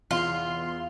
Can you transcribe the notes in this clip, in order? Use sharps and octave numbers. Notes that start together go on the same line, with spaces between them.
E2 F4 C6